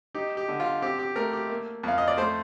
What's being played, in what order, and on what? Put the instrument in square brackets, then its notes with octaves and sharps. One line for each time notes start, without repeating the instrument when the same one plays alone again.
[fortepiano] D#4 G4
G4
D3
F4
C4 G4
G4
A3 A#4
G4
A#3
F2 F5
D#5
D5
A3 C5